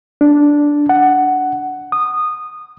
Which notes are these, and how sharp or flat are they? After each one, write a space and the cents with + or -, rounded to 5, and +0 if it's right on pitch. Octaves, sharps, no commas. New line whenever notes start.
D4 -5
F#5 +10
D#6 -15